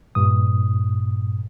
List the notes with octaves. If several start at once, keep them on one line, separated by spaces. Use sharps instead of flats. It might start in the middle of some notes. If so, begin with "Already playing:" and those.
G2 A#2 D#6